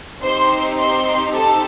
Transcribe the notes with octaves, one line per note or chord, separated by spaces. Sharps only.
C4 D#4 G4 C5 C6
C5 C6
A4 A5